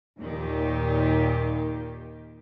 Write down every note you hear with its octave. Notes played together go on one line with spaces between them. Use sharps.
D#2 A#2 D#3 G4